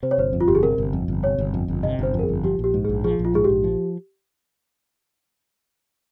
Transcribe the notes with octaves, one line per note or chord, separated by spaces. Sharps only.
C3 C5
C#5
G1 C5
F2
F4
G1 G4
G#4
C3 A#4
G1
F2
G1
C3 C#5
G1
F2
G1
C3 D#5
G1 C5
F2
A#4
G#4
G1
F3 G4
A#1 G4
G#2
G#4
A#1
F3 G#4
A#1
F4
G#2 G#4
G4
A#1
F3